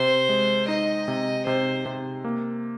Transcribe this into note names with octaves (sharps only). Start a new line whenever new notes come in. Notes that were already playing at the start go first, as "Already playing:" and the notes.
Already playing: C3 C5
G#3
D#4 D#5
C3
C3 C5
C3
A#3